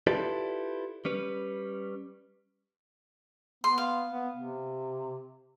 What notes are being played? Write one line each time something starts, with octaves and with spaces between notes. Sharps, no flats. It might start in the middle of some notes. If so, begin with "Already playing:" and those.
E4 F4 G4 A4 B4 D5
G3 C#4 B4
B3 C6
F5
B3
C3